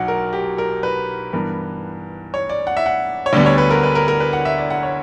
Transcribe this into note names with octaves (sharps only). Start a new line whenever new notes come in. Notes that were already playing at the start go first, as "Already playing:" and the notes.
Already playing: B1 B2 F#3 F#5
A#4
G4
A#4
B4
G2 E3 B3 A#4
C#5
D5
F#5
E5
F#5
C#5
D2 D3 G3 B3 D5
C#5
B4
A#4
B4
A#4
A#4
B4
F#5
E5
D5
F#5
C#5